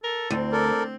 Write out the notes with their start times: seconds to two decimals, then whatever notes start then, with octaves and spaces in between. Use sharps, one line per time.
0.04 A4 A#4
0.30 D2 C4
0.52 A4 A#4 D5